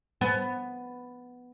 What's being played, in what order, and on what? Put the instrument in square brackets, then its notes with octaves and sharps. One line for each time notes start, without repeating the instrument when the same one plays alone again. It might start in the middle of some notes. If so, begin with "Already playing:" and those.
[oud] B3